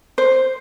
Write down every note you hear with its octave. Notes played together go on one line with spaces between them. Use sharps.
C5